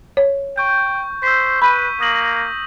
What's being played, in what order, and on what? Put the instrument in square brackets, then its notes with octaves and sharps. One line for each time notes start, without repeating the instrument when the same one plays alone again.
[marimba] C#5
[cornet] G5 [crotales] C#6 G6
[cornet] C5 [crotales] E6 B6
[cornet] B4 [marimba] B5 [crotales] G6 D#7
[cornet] A#3 [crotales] D#6 A#6 F#7